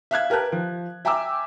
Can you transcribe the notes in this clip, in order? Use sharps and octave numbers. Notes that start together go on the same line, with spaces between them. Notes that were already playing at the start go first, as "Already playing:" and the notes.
E5 F5 F#6 G#6
G4 A#4 B4 A5 F#6
F3
E5 G5 G#5 A#5 D6 E6